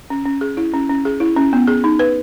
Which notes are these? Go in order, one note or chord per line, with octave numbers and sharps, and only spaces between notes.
C#4
C#4
G#4
E4
C#4
C#4
G#4
E4
C#4
B3
G#4
D#4
B4